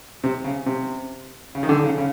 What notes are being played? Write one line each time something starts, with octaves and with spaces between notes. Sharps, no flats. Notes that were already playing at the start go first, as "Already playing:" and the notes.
C3
C#3
C3
C#3
D#3
D3
C#3
C#3